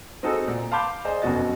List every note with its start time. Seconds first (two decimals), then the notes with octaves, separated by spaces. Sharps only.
0.23 C4 D#4 F#4 G#4 A4
0.48 A#2
0.72 F5 A5 B5 C6 D6 G6
1.05 G#4 C5 D5 D#5
1.22 F1 F#2 B2 F#4 D#5 A6